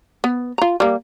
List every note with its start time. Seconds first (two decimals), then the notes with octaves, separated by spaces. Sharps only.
0.24 B3
0.58 F4 A#5
0.80 G3 A#3